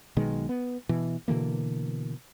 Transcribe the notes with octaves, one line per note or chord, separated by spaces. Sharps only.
B1 B2 D#3 G#3
B3
B2 E3
B2 D3 E3 A#3